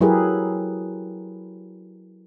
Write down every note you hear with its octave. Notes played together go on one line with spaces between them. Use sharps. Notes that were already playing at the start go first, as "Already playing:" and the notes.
F#3 E4 G4 G#4 A#4 B4